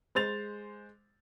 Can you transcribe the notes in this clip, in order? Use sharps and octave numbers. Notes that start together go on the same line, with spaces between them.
G#3 C5 A6 F7